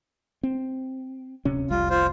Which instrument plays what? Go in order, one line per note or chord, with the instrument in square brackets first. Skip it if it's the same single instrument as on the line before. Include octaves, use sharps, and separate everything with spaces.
[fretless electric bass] C4
D1 C3 C#4
[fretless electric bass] F1 C2 G3 [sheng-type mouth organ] F4
[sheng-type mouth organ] F4 C5